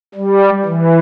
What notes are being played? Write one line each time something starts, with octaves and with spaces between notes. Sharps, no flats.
G3
E3